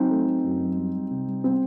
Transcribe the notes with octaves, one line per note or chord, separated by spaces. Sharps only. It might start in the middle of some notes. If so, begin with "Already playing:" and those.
Already playing: F#3 C4 D#4
A3
A3
F#2
F#3
G3
G3
C3
G3
G3 C4